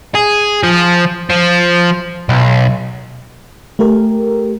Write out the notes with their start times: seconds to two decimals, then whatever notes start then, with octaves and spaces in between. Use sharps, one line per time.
0.15 G#4
0.63 F3
1.30 F3
2.29 B1
3.79 A3 G4 A#4